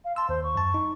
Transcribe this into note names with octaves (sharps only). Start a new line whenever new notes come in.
F5
A5 C6 E6
D#2 C5
C#6
F#2 A5
D#4